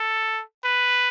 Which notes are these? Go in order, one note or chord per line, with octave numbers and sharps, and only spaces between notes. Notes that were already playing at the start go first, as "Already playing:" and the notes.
Already playing: A4
B4